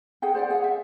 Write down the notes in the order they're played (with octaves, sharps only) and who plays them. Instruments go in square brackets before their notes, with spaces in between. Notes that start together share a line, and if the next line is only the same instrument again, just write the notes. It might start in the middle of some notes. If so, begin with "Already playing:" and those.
[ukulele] G#4 F#5 G5
C5 D5 F#5 G5
G#4 F5 F#5
E5